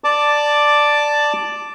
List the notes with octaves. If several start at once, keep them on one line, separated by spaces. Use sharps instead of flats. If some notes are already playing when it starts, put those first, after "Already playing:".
D5 A5 D6